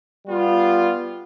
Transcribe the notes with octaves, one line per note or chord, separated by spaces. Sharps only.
G3 B3 F4